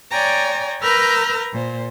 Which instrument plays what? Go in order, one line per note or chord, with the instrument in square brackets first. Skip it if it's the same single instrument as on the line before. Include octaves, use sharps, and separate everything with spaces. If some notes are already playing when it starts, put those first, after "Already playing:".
[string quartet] C#5 D5 G5 G#5 A#5
A#4 B4 A#5 E6 F6 G6
A#2 C5